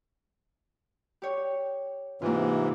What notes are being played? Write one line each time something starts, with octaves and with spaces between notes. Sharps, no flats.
G4 C#5
G#2 C3 E3 A#3 F4